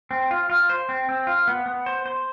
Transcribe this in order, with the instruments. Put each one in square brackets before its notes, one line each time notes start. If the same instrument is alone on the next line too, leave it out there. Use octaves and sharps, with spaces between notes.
[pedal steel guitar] C4
F4
F4
C5
C4
C4
F4
B3
B3
C5
C5